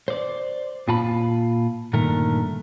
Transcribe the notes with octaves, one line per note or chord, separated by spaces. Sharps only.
C5 D5
A#2 F4 A5 B5
G2 A#2 D3 D#3 A3 A#4